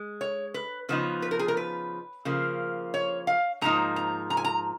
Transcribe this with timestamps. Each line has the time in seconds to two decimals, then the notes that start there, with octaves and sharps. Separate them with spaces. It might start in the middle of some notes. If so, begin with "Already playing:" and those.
Already playing: G#3
0.21 C#5
0.54 B4
0.89 C#3 F3 B3 D#4 B4
1.22 B4
1.31 A#4
1.39 G#4
1.48 A#4
1.57 B4
2.25 C#3 F3 A#3
2.94 C#5
3.27 F5
3.61 G#2 F3 A#3 D#4 A#5
3.96 A#5
4.30 A#5
4.37 G#5
4.45 A#5